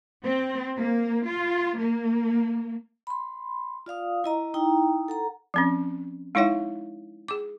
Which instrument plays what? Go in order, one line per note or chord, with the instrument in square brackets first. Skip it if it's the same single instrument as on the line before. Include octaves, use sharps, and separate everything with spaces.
[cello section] C4
A#3
F4
A#3
[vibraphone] B5 C6
F4 D5 F5 D#6
E4 D#5 A#5
D#4 E4 G5 A#5
A4 F#5 A#5
[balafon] F3 C4 C#4
G#3 D#4 E4 C#5 E5 F#5
G#4 D6